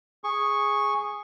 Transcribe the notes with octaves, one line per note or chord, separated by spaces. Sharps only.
G#4 C#6